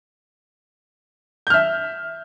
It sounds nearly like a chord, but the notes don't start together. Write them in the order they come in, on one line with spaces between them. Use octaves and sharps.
G6 F6 E5